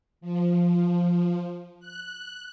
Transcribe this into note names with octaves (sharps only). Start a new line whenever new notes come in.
F3
F#6